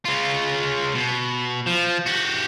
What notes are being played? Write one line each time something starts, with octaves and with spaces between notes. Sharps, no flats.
C#3 F4
B2
F3
F#4 G4